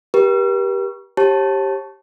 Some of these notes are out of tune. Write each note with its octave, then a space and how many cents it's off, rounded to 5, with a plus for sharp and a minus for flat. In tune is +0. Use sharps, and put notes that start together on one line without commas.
G4 +0 A#4 +45
G4 +0 C#5 -45 A5 +0